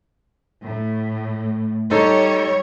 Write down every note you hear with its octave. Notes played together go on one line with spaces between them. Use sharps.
A2
G3 D#4 A4 C#5